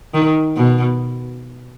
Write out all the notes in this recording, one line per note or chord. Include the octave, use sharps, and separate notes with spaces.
D#3
B2